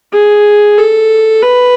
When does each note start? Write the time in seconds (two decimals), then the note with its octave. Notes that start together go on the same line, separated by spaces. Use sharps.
0.13 G#4
0.78 A4
1.42 B4